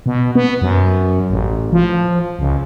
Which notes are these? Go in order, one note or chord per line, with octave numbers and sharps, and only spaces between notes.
B2
B3
F#2
A1
F3
C#2